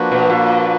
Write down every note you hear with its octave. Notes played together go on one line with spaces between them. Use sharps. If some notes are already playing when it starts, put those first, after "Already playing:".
Already playing: F3 A#3 D4 F#4 B4
B2
A#2